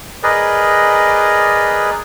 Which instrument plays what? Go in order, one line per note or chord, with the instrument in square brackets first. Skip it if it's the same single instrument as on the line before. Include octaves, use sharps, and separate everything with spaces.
[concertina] G#4 A#4 B4 D5 D#5